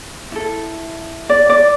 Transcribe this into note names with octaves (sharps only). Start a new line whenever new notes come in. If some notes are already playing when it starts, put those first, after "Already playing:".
E4 A4
D5
D5